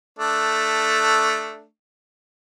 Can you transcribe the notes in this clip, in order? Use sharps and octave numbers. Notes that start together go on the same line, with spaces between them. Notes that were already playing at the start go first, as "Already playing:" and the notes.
A3 D4